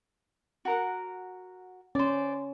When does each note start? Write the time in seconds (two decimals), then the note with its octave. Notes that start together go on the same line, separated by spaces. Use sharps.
0.65 F#4 A#4 F#5
1.95 C#4 C5 D5